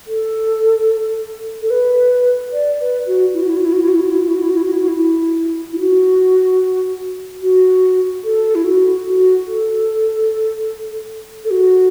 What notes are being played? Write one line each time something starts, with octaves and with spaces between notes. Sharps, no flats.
A4
A4
B4
D5
B4
F#4
E4
F#4
E4
F#4
E4
F#4
E4
F#4
E4
F#4
E4
F#4
E4
F#4
E4
F#4
E4
F#4
E4
F#4
E4
E4
F#4
F#4
A4
E4
F#4
F#4
A4
A4
F#4